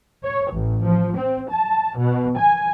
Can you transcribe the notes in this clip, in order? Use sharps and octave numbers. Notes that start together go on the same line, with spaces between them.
C#5
A1
F3
C4
A5
B2
G#5